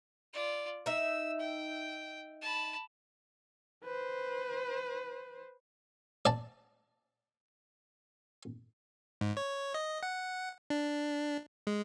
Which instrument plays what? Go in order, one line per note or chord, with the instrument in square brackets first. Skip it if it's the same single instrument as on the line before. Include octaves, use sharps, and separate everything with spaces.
[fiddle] F4 D5
[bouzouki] D#4 E5 [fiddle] E6
[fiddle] G5
A5 B5
[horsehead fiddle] B4 C5
[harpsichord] D5 A5
[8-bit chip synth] G#2
C#5
D#5
F#5
D4
G#3